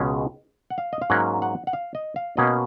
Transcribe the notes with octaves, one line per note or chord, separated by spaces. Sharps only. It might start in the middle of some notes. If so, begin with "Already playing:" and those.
Already playing: C#2 B2 G#3 C#4
F#5
F5
D#5
F5
G#2 F#3 A#3 C#4 F#5
F#5
F#5
F5
D#5
F5
B2 A#3 C#4 D#5